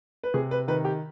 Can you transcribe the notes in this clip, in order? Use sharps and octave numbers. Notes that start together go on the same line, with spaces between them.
B4
C3 G#4
B4
D#3 B4
G4